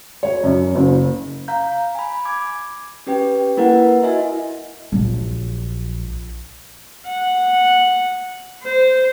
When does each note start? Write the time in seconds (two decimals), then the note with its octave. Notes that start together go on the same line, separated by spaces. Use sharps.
0.23 C#5
0.43 F#2
0.75 F#1
1.48 F5 A#5 G6
1.95 G#5 B5
2.25 D6 G#6
3.07 C#4 G4 B4 G5
3.57 A#3 E4 A#4 B4 F#5
4.03 E4 F#4 D#5 E5 G#5
4.92 A#1 F#3
7.08 F#5
8.64 C5